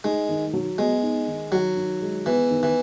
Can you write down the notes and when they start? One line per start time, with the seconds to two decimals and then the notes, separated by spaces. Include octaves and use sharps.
0.04 G#3 D#4
0.29 D#3
0.53 F#3
0.78 G#3 B3
1.03 D#4
1.27 D#3
1.52 D#3 F#3
1.76 D#3
2.01 G#3
2.26 E3 B3
2.50 D#3
2.63 E3